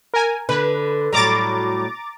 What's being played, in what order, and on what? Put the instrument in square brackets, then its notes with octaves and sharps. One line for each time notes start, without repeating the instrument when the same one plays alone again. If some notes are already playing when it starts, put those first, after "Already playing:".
[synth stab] A#4 G#5
[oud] D3 [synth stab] B4
[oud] A2 F#3 G3 [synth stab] A#5 D6 A6